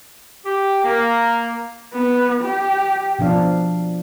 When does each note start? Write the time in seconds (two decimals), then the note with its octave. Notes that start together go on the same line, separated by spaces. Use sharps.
0.45 G4
0.83 A#3
1.94 B3
2.43 G4
3.19 B2 F3 D4 F5